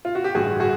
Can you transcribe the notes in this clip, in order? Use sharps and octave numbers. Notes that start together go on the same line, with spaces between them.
F4
F#4
G4
A1 G2 D3 F#4 G#4
F#4 G#4